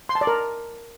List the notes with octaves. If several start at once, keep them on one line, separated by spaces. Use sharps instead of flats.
C6
A5
D5
A#4